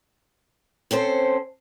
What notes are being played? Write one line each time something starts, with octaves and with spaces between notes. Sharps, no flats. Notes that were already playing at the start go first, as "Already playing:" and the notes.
C4 C#4 A4 C5